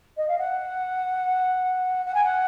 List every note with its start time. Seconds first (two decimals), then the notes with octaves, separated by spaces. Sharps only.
0.17 D#5
0.28 F5
0.38 F#5
2.05 F#5
2.14 G#5
2.24 F#5